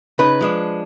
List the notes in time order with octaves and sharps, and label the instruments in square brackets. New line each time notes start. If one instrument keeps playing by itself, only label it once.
[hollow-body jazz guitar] C#3 D#4 [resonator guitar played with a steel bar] B4
[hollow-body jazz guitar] F3 G#3 D4